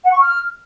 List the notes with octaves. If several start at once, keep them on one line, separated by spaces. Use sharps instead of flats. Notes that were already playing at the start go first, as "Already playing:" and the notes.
F#5
C#6
F6